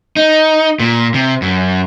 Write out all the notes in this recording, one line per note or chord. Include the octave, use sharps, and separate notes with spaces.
D#4
A#2
C3
F#2